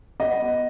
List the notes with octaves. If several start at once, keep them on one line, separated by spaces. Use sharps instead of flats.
B3 D#5